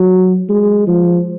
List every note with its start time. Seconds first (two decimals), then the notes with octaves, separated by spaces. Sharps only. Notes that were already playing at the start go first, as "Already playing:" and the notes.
Already playing: F#3
0.49 G#3
0.87 F3